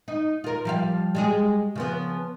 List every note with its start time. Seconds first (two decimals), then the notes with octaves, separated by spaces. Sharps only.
0.08 D#4
0.44 F4 A#4
0.65 F3 G3 F5
1.15 G3 G#3 G#4
1.76 C#3 F3 B3